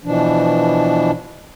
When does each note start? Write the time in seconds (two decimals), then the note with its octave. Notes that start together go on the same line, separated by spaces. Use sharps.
0.04 B2 E3 F3 D4